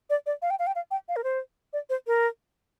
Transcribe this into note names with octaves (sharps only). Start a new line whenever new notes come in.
D5
D5
F5
G5
F5
G5
F5
G5
F5
A#4
C5
D5
C5
A#4